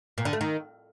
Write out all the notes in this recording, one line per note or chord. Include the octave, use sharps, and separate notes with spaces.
A#2
D3
A3
D#3